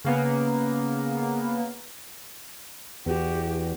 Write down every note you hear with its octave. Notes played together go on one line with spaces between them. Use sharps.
C#3 A#3 B3
E2 F#4 G4